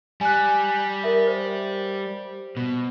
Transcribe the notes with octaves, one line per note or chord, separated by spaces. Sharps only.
G3 G#5 F#6
A#4 E5
C5
B2